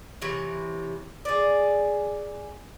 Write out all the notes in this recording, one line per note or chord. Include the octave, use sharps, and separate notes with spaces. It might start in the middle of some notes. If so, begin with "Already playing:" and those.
C3 E3 C#5
G#4 D5